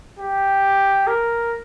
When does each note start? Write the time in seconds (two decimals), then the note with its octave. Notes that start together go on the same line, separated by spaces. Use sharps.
0.19 G4
1.07 A#4